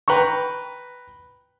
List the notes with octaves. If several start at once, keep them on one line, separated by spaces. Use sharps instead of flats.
B4 G5 A#5 C#6